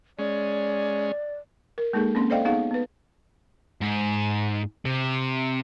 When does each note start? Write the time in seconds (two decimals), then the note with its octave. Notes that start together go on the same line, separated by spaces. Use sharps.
0.19 G#3 C#4 D5
1.78 A#4
1.93 G#3 A#3 D#4 G#4 A4
2.15 A#3 C4 C#4 C6
2.30 A4 C5 D5 D#5 F5 G5
2.45 B3 D#4 G#4 F5 F#5
2.71 B3 B4
3.81 G#2
4.85 C3